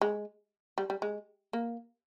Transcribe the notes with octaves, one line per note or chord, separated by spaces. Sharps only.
G#3
G3
G3
G#3
A#3